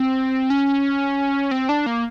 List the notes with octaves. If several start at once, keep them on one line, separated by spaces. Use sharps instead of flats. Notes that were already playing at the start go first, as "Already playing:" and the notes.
Already playing: C4
C#4
C4
D4
A#3